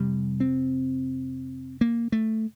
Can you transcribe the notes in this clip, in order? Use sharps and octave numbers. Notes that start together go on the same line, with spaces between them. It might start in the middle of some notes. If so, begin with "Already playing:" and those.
Already playing: F2 C3 G3
C4
A#3
A3